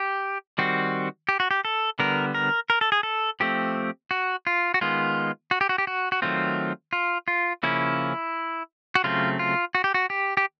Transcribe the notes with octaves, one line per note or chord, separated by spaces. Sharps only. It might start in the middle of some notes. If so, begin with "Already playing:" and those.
Already playing: G4
D#3 G3 C4 F#4
G4
F#4
G4
A4
D3 G3 B3 A#4
A#4
A#4
A4
G#4
A4
F3 A3 C4 G4
F#4
F4
F#4
D#3 G#3 B3 F4
F#4
G4
F#4
G4
F#4
F#4
D#3 F#3 A3 C4 F4
F4
F4
C#3 F3 A#3 C#4 E4
F#4
C#3 F#3 A3 C4 F4
F4
F#4
G4
F#4
G4
G4